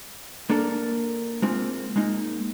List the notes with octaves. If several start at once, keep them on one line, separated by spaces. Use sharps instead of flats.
A#3 D4 A4 A#4
G#3 A#3 C4 F4
G#3 A#3 D#4